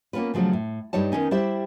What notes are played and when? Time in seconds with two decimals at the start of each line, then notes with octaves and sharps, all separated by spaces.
0.13 A#3 B3 C#4 D4 F4 B4
0.34 C#3 F3 F#3 A3 C#4
0.53 A2
0.93 G2 G3 D#4 C#5 A5
1.12 D#3 F3 B3 C#4 D#4
1.31 G3 E4 G4 C5 E5